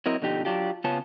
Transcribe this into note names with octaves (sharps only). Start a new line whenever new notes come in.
F#3 C4 E4 A#4 D#5
B2 D3 F3 D#4 G4
F#3 D4 F4 G4
C#3 B3 C#4 F4 A5